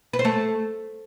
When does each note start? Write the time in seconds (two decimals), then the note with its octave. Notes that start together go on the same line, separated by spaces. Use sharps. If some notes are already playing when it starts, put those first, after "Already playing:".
0.13 B4
0.19 C5
0.25 A3